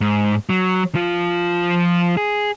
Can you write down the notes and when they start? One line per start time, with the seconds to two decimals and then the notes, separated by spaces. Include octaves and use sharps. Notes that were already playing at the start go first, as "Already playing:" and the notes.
0.01 G#2
0.49 F#3
0.95 F3 F4
2.17 G#4